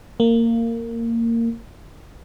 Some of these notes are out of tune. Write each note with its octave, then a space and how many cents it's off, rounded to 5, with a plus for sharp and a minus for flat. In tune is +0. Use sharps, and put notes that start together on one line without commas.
A#3 -20